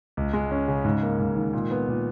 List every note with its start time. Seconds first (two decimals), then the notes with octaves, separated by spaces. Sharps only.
0.17 C#2
0.33 G#3
0.51 C#4
0.68 C#3
0.85 G#2
1.03 A#3
1.20 G#2
1.36 D#3
1.53 A#2
1.71 B3
1.88 A#2